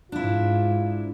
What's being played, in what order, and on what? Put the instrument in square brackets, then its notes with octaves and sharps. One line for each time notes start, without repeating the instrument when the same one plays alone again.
[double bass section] G#2 [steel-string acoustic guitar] D4 E4 [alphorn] F4